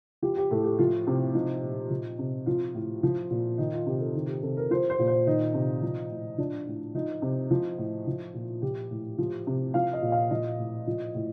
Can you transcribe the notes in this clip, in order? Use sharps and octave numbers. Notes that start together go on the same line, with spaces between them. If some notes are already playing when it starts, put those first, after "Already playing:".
F3 G4
G4
A2 A4
G4
F3 F4
C3 G4
F3 D#4
A#2
F3
C3
F3 F4
A2
F3
A#2
D#3 D#4
F4
C3 G4
A4
D#3
G4
C3 A4
A#4
F3 C5
C5
A#2
C5
D#3 D#4
C3
F3
A2
F3 D4
A2
F3 D#4
C3
F3
A2
F3
A#2
F3 G4
A2
F3
C3
F3 F5
D#5
A#2
F5
F3 D#5
A2
F3
A2